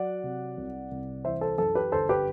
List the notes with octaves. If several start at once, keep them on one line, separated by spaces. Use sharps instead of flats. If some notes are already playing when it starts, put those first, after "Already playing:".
Already playing: F#3 D5 F#5
C3
C2
C2
E3 C5 E5
A4 C5
F#2 A4
G4 B4
G1 A4 C5
G4 B4